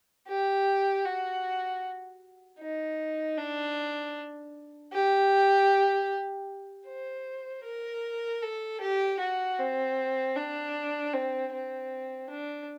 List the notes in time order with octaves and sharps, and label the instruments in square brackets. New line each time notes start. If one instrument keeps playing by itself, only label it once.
[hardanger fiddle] G4
F#4
D#4
D4
G4
C5
A#4
A4
G4
F#4
C4
D4
C4
C4
D4